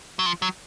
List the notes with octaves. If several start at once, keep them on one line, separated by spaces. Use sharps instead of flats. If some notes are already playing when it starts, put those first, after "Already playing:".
F#3
F3
F#3